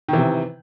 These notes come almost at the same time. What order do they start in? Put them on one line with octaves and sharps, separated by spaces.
D#3 E3 C3